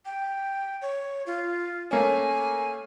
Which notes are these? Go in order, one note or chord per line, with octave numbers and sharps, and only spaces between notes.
G5
C#5
F4
A3 A#3 C#4 G#5